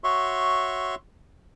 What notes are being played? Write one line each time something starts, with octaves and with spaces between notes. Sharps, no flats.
F#4 C#5 E5 C6 C#6